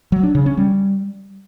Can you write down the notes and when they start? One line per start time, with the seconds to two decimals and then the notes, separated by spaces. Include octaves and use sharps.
0.12 F#3
0.23 D4
0.35 C#3
0.46 C#4
0.57 G3